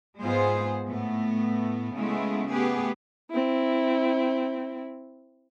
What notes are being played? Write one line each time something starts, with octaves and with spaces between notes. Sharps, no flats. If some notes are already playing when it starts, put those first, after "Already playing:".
G#2 G#3 B3 F4 G#4 C5
A2 A3 B3
C#3 G#3 A3 B3 E4
A3 B3 G4 G#4 B4
C4 E4